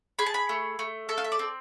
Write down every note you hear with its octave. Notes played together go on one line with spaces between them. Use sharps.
G#4 B5
A5
B5
A3
A3
A4 E5
F5
E5
D5
C4